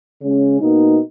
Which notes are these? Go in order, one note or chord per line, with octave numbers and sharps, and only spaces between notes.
C#3 G#3 C#4
B2 A#3 D#4